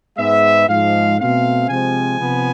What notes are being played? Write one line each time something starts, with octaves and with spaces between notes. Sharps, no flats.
G#2 G#3 B3 E5
G#2 F3 G#3 F5
B2 A3 C4 F5
C3 F3 G#3 C4 G#5
C3 F3 B3